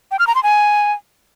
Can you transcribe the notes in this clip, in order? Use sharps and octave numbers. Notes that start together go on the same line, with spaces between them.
G5
F6
A#5
C6
G#5